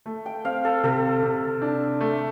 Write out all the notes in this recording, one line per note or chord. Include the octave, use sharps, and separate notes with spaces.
A3
G5
C4 F5
A4
C3 A4
C3
D4
A3